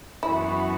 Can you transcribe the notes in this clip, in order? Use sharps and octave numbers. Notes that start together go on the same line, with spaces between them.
F#2 E3 B3 E4 F#4